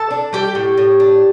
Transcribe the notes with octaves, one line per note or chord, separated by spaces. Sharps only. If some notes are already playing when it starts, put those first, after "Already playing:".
Already playing: A4 A5
D4
G3 G4 G5
A2
A2
D4